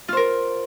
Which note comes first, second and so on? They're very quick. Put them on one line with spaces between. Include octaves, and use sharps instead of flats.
F4 C5 A#4